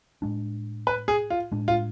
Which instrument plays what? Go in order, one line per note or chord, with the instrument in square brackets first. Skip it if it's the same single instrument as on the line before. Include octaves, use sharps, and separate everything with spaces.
[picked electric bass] A2 G#3 D4
[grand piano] B4
G#4
F4
[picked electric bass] A2 G#3 D4
[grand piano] F4